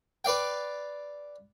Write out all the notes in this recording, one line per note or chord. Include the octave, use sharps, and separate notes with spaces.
B4 D5 F5 G5